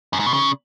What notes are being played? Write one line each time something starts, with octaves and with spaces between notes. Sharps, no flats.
F#2
G#2
B2
C#3